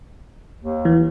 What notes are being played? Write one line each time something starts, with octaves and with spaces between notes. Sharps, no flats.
D#2
E3